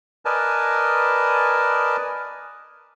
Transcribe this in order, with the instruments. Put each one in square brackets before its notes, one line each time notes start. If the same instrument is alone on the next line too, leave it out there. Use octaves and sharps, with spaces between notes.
[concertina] A#4 B4 D5 D#5 G#5 A5